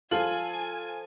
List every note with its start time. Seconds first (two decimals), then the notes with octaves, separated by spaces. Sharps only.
0.11 F3 F4 A4 G#5 F#7